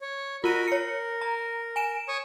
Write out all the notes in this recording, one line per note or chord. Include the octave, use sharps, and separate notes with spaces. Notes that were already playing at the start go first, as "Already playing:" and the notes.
C#5
F4 F#4 A#4 B5 D#7
A#4 C#5 C#7
A#5
G#5 D7 E7
C#5 C#6 D#6